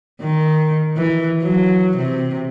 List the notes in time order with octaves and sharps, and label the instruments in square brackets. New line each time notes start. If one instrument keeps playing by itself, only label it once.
[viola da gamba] D#3
E3
F#3
C3